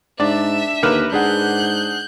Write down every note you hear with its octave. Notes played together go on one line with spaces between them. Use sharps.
G#2 D4 D5 E5
D#2 D3 A#4 B4
G#2 D4 G#4 F#5 F#6 G6